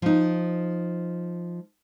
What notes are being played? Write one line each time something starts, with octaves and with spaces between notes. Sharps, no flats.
F3 D#4